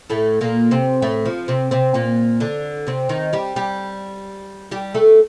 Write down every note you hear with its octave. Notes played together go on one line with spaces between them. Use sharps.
A2 A3
A#2 A#3
C3 C4
A2 A3
F3
C3 C4
C3 C4
A#2 A#3
D3 D4
C3 C4
D#3 D#4
G3 G4
G3 G4
G3 G4
A3 A4